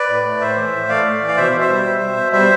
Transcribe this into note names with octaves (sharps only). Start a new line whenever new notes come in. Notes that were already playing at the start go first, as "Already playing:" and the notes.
Already playing: B4 D5
A2
A3
A2 C5 E5
E3
A2
A3 D5 F5
A2
E3
F5
B2 C5 E5
B2
C5 E5
G3
G3
B2
B2
G3 C5 E5